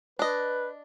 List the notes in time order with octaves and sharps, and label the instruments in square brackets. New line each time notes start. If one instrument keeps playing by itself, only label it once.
[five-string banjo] D4 D#5 [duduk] B4